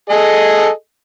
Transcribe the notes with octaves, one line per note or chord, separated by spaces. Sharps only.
G#4 A4 D#5